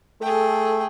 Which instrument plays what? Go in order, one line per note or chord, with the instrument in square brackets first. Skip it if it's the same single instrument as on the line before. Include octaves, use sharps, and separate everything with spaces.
[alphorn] A3 [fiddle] G#4 G5 [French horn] A4